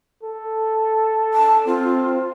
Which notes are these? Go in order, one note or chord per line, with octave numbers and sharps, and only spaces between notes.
A4
A5
C4 F4